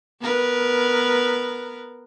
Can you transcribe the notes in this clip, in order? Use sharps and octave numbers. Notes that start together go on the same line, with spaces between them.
B3 A#4 B4